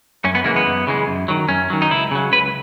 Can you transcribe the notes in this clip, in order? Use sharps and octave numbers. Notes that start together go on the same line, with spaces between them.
F#2 C#4
B3
C#3 E3 G#3 A#3
B3
F#2
C#3 E3 G#3
F#2
D#3 F#3
F#2 C#4
D#3 F#3
D#4
C#2 E4
C#3 F#3
C#2 B4